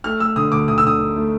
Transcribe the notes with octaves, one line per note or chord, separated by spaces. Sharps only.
A3 F6
A3 E6
D3 D#6
D2 D6
D2 D#6
E6
D3 D#6
D3
A3